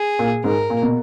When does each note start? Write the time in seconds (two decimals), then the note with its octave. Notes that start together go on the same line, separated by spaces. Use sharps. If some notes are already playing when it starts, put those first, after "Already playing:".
Already playing: G#4
0.19 A#2
0.44 G#2 A#4
0.70 A#2
0.83 B2